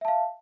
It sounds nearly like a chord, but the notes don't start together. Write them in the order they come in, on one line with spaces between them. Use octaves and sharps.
E5 A5 F5